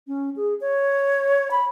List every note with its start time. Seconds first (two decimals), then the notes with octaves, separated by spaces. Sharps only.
0.07 C#4
0.36 G#4
0.61 C#5
1.51 B5